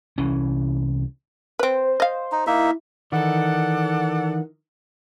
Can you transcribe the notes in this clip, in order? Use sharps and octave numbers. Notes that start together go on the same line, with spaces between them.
C2 E3 C#4
C4 B4 C5
D#5 F5
D#4
A#3 D#4 E4 E5
D#3 E3 A4 D5 F#5